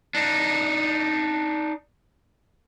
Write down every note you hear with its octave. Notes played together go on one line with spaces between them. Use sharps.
D4 D#4